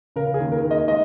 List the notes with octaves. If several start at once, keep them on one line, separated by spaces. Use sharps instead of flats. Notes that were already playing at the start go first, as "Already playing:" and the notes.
C#3 A#4
G#4
D#2
A#4
D#2
D#5
G#3 D#5